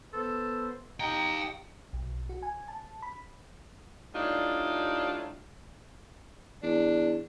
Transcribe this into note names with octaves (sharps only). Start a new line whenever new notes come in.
B3 A4 C5
D#4 G4 D#5 F5 G5 A#5
B1
F#4
G#5
A5
B5
A2 G3 D4 D#4 F4
E2 D4